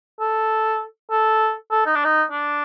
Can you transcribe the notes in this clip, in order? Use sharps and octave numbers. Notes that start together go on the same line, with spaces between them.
A4
A4
A4
D#4
D4
D#4
D4